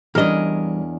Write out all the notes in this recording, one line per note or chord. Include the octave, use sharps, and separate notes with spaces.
E2 E3 G3 C#4 D4 A#4 D#5